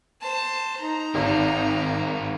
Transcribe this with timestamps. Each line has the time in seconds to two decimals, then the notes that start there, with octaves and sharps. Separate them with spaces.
0.22 C5 A5
0.80 D#4 A#5
1.15 G#1 D#3 C4